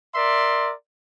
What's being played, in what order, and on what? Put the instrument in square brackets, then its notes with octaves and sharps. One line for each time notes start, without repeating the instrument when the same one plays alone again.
[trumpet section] A#4 D5 E5 C6